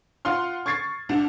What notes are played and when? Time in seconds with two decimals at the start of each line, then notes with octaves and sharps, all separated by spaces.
0.25 F4 F#5 C6 F6
0.66 C#6 G#6 A6 C7
1.09 C2 D4